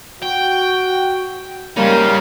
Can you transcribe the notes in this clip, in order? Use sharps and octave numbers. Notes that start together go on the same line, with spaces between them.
F#4 G5
C#3 G3 A#3 D#4 C5